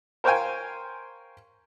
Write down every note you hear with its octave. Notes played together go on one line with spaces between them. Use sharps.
A#4 C5 C#5 F5 G5 G#5